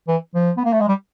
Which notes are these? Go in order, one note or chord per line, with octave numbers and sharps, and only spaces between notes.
E3
F3
B3
A#3
A3
G#3
G3